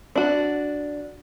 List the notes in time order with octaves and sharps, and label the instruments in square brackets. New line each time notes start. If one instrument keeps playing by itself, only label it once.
[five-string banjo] D4 F#4